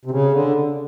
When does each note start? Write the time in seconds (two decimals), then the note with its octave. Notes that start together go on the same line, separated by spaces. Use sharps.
0.05 C3
0.11 C#3
0.32 D3